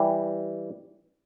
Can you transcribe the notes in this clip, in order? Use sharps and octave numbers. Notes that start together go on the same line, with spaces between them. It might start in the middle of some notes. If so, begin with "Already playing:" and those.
Already playing: E3 G3